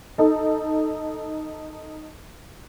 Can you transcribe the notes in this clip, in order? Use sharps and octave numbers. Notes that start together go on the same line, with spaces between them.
D#4 A4